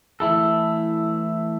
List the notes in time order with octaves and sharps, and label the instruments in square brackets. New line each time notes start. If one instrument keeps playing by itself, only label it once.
[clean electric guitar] E3 A3 E4 A4